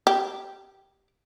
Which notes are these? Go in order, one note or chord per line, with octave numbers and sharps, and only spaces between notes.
G4